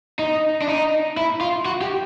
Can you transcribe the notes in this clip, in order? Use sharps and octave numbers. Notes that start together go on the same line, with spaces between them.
D#4
D4
D#4
E4
F4
F#4
G4